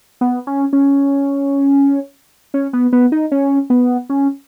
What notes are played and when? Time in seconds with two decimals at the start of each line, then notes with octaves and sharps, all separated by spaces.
0.21 B3
0.47 C#4
0.73 C#4
2.54 C#4
2.73 B3
2.93 B3
3.12 D#4
3.32 C#4
3.70 B3
4.10 C#4